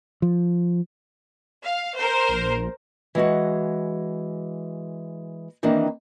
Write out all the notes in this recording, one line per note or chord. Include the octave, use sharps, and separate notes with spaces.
F3
F5
A#4 C5
A#1
E3 G#3 F#4 F#5
D#3 E3 A#3 C4 D4